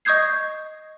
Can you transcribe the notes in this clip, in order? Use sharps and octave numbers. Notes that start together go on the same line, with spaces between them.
D#5 C#6 D#6 G6 G#6 C7